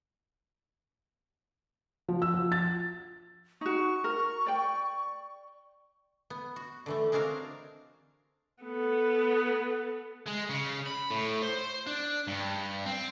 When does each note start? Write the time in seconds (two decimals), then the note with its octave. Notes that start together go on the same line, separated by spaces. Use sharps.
2.08 F3
2.22 E6
2.34 F3
2.52 A6
3.61 D#4 F#4 C#6
4.04 A#4
4.46 D5 G5
6.30 B3
6.56 F#4
6.86 D3 E3 A3
7.12 G#3 C4 D4 F#4 A#4 F5
8.63 B3 A4
10.28 G#3
10.50 C#3
10.86 B5
11.10 A2
11.43 C5
11.87 D4
12.28 G2
12.86 C4